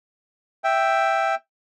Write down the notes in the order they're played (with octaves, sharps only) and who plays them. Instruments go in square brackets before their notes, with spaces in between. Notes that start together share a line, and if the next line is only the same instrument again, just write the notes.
[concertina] E5 G5